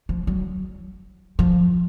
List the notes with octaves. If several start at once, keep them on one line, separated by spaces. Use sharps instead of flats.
F3
F#3
F3